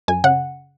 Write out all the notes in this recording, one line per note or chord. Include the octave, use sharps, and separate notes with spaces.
F#2 G#5
C#3 F#5